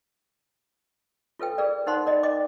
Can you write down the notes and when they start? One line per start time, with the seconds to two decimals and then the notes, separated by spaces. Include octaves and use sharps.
1.39 F4 A4 B4 G5
1.58 G#4 A#4 B4 D5
1.87 D#4 A#4 C5 F#5 B5 C6
2.06 A#4 D5 D#5
2.23 D#5 G5 D6